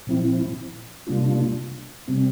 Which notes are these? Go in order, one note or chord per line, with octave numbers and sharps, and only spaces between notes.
A#2 F3 C4 E4
C3 G3 A#3 D4 F4
C3 G3 C4